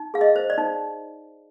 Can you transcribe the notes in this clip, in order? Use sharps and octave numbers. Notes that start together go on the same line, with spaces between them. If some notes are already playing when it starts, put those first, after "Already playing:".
Already playing: D#4
G#4 F5
D#5
C5
D5
D#4